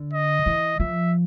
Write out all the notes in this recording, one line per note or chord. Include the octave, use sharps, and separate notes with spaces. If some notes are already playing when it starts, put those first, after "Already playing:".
Already playing: D3
D#5
E3
F3 E5